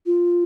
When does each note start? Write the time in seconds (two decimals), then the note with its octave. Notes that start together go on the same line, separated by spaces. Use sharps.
0.06 F4